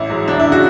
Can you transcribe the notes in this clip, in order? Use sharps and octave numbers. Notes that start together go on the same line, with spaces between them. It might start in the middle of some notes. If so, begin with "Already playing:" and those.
Already playing: A1 E4
G#2 F#3
E1 D4
E4
C#3 F#4